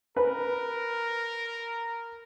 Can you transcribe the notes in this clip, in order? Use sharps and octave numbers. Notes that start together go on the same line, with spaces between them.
A#4 B4